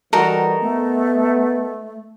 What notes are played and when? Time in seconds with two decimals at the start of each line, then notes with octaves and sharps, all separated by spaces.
0.13 E3 G3 D#4 F#4 A4 A#4
0.62 A3 B3